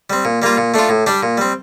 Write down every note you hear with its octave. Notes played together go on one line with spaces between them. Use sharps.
G3 C4
A#2
G3 A#3 F4
A#2
A3 D4 F4
A2
G3 D4 G4
A#2
G3 C4